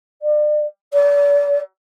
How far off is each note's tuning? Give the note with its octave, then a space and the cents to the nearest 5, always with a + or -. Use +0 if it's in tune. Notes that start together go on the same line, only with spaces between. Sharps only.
D5 +35
D5 -40